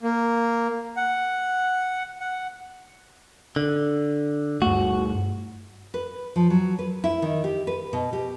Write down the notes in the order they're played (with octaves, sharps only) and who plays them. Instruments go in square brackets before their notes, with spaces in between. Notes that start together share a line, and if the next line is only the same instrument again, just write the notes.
[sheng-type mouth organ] A#3
F#5
F#5
[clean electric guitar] D3
[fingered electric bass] G2 A3 [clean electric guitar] F#4
[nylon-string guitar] B4
F3
F#3
B4
E4
D#3
G4
B4
B2
G4